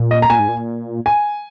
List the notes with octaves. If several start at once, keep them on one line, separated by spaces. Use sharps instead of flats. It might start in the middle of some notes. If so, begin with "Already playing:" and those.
Already playing: A#2
D#5
A#5
A#2 G#5
G#2
A#2
G#5